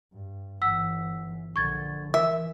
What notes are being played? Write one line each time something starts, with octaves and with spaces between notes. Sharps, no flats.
G2
G1 E3 F#5 E6 B6
A#1 D3 C#6 G#6 A6
E3 A#4 E5